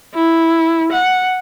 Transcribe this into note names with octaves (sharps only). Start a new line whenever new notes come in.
E4
F#5